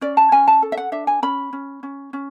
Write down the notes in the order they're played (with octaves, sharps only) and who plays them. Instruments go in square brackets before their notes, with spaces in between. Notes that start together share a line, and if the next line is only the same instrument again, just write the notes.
[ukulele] C#4 D5
A5
C#4 G#5
A5
A4
E5
F#5
D4 E5
G#5
C#4 B5
C#4
C#4
C#4